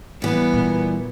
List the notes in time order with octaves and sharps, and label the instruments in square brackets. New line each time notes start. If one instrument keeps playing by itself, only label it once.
[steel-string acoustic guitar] E3 G3 [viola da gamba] B3
[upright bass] A#2